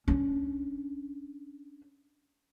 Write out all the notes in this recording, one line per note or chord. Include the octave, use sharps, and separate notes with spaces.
C#4 D4